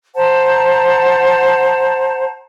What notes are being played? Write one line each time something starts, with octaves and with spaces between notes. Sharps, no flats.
C5 F#5 A5 A#5